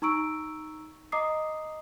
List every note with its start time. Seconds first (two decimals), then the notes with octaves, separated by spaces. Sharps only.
0.02 D#4 A#5 C#6 E6 D7
1.12 D#5 A#5 D6 D#6 C7